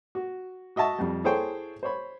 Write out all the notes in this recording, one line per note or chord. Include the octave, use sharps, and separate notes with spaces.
F#4
F#4 D#5 E5 A5 C#6
F2 G3
E4 G#4 A4 C5 C#5 G5
C5 C#5 B5